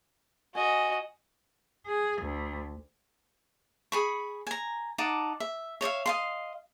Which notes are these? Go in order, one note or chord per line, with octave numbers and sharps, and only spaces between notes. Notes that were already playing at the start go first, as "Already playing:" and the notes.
F#4 D#5 G#5
G#4
D2
G#4 B5 C#6
G#5 A#5
D#4 F#5 A5 D6
E5
C#5 D5 E5 F5
D#5 F5 C6